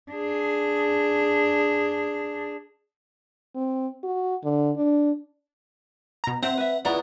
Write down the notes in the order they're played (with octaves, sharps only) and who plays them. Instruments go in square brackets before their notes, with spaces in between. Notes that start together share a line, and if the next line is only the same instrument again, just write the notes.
[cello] D4 G#4
[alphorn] C4
F#4
D3
D4
[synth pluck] B2 A#5
[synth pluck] C4 [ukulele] C5 E5 [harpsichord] F#5 A#5
[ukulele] B4 E5
[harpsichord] C#2 B3 E4 [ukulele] D5 F#5 A#5